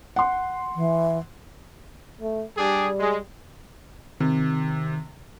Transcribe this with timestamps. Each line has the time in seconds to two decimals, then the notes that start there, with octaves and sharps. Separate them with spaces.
0.16 F#5 C6
0.75 E3
2.21 A3
2.57 G3 D4 G4 G#4
2.99 G#3
4.20 C3 D#3